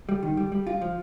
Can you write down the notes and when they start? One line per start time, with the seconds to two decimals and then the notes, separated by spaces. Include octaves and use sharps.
0.09 G3
0.23 D#3
0.37 G3
0.52 G3
0.67 F4
0.82 F3